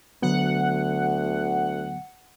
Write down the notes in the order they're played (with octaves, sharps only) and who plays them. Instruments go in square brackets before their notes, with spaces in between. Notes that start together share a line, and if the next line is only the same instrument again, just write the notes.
[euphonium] D2 [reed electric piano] D3 F#3 B3 [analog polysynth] F#5